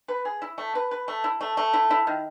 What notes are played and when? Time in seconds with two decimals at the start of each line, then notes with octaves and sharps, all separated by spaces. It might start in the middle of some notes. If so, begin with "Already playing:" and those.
0.08 B4
0.25 G#4
0.42 E4
0.58 A3
0.75 B4
0.91 B4
1.08 A3
1.24 E4
1.41 A3
1.57 A3
1.73 E4
1.90 E4
2.07 D#3